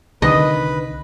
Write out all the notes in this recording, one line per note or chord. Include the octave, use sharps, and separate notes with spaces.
C2 D3 D#3 B4 D#5